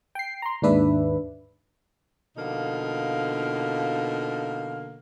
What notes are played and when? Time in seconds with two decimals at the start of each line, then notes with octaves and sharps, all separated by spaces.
0.15 G5 C7
0.42 A#5 C6
0.62 D#2 G#2 D4 B4 E5
2.37 B2 D3 F3 A#3 D#4 F5